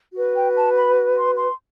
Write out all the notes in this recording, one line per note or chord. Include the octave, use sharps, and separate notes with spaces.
F#4 B4
G5
A5
B5
C6
C6